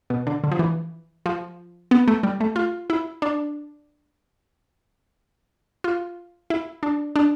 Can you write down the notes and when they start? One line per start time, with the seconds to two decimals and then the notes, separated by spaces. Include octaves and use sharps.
0.10 B2
0.27 D3
0.44 D3
0.52 F3
0.59 E3
1.26 F3
1.91 B3
2.08 A3
2.23 G3
2.40 A3
2.56 F4
2.90 E4
3.22 D4
5.84 F4
6.50 E4
6.83 D4
7.16 D4